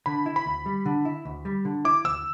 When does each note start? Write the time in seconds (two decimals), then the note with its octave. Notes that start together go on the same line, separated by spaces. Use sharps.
0.06 D3 B5
0.26 E4
0.36 B5
0.46 D2
0.66 G3
0.86 D3
1.05 E4
1.25 D2
1.45 G3
1.65 D3
1.85 E4 D6
2.04 D2 E6